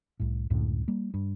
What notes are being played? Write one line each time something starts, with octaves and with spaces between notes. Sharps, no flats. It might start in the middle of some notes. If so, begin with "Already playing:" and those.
C2 A2
C#2 F#2 A2 D3
G3 A#3
G2